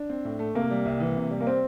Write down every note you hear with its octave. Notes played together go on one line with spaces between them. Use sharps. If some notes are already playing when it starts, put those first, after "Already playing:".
Already playing: D4
C4
A2
A3
C3 A#3
G3
C2
E3
C3
G3
A#3
C4